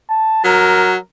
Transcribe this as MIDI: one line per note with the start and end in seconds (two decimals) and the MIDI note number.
0.10 0.43 81
0.45 0.96 54
0.45 0.98 70